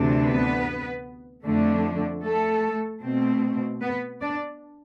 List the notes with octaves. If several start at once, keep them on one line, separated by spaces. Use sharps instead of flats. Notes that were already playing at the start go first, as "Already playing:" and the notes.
Already playing: D2 C3 E3 D4
B3 B4
F2 D3 A3 D4
A3 A4
B2 A3 C4
B3 B4
D4 D5